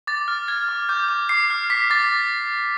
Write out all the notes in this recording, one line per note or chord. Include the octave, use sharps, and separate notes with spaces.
D6 A6
F6
F6 G#6
D6
D6 G6
D6
D6 C7
F6
D6 B6
D6 A6